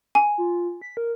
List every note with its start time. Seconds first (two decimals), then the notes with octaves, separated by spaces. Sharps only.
0.15 G#5
0.38 F4
0.82 B6
0.97 A#4